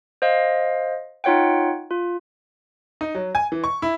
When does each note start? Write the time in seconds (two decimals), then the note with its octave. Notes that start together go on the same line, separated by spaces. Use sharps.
0.22 C5 D#5 F5
1.24 D#4 F4 C#5 F#5 G5
1.91 F4
3.01 D#4
3.15 F#3
3.35 G#5
3.52 E3
3.64 C#6
3.82 E4